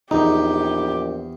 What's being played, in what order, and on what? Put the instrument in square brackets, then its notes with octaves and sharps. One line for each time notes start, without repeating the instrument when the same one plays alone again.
[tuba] A#1 [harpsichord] E2 [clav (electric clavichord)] D#4 [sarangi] G4